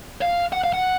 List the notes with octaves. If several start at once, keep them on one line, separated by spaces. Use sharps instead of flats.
F5
F#5
F5
F#5